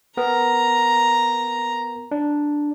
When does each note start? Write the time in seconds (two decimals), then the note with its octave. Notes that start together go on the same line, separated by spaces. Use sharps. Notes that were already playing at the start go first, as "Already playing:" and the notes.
0.17 B3 A#4 A#5
2.11 D4